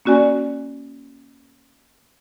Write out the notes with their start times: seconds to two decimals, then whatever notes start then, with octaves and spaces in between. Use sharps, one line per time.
0.05 A#3 C#4 F#4 D5 G#5